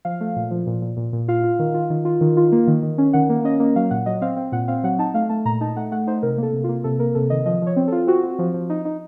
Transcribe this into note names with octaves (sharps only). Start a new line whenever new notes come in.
F3 F5
A3
A#2
F3
A#2
A#2
A#2
A#2
F4 F5
F4
D#3
F4
D#3
F4
D#3
F4
A#3
D#3
D#3
C#4
D#3 F#5
A#3
C#4 D#5
A#3
F#3 F5
A#2 F#5
F#3 D#5
C4 F5
C4
A#2 F#5
C4 F5
F#3 F#5
D#4 A5
A3 F5
A3 A5
A#2 A#5
D#4 A5
A3 F#5
A3 F#5
D#4 C5
C3 A#4
A#3 A4
C3
F4
A#3
C3 A4
A#3 A#4
C3 A4
D#3 D#5
F3 D#5
F3 C#5
C4
A4
F4
C4 F#4
C4
F3
F3
D#4
D#4